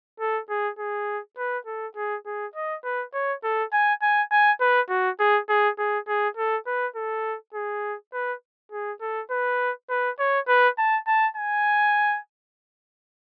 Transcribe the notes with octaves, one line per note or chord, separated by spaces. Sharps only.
A4
G#4
G#4
B4
A4
G#4
G#4
D#5
B4
C#5
A4
G#5
G#5
G#5
B4
F#4
G#4
G#4
G#4
G#4
A4
B4
A4
G#4
B4
G#4
A4
B4
B4
C#5
B4
A5
A5
G#5